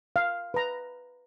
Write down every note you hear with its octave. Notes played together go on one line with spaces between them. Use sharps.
F5
B4 A#5